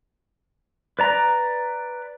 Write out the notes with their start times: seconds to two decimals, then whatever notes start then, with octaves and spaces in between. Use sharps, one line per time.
0.99 B4 D5 A#5